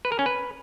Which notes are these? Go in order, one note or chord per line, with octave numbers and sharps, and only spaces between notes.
B4
A#4
C#4
B4